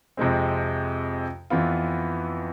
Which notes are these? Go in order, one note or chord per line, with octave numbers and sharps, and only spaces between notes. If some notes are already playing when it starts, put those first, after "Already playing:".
F2 C3 F3 G#3 C4
F2 E3 B3 F4